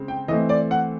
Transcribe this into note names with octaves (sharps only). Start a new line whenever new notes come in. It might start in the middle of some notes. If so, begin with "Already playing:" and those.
Already playing: C#3 G#3 C4
G5
E3 A3 C4 D#5
D5
F#5